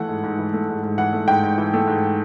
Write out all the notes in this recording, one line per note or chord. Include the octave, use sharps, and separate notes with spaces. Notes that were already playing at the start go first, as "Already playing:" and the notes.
Already playing: E3 A3 F#5
G#2
G#2
E3
A3
G#2
G#2
E3 F#5
A3
G#2 G5
G#2
E3
A3
G#2